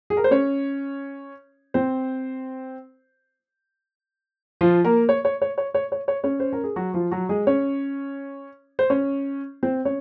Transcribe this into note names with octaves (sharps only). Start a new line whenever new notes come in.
G#4
A#4
C5
C#4 C#5
C4 C5
F3 F4
A#3 A#4
C#5
C#5
C#5
C#5
C#5
C#5
C#5
C#4 C#5
C5
A#4
G#4
F#3 F#4
F3 F4
F#3 F#4
G#3 G#4
C#4 C#5
C5
C#4 C#5
C4 C5
C#4 C#5